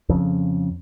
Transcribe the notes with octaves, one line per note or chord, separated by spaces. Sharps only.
F2 C#3